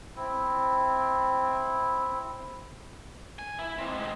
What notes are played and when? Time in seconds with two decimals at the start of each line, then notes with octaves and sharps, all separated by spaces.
0.16 C4 E4
3.39 G#5
3.59 E4
3.79 G#3 C4
3.99 G#3 C4